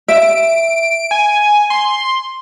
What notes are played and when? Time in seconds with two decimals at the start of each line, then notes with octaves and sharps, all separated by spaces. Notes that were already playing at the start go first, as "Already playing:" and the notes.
0.08 E5 D7
1.11 G#5
1.70 C6